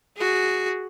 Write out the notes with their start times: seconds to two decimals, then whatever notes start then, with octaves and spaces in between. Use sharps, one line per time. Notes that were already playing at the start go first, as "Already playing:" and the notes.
0.16 F#4 G#4